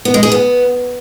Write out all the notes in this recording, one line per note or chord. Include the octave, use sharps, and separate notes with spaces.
B3
G#3
G#4
B3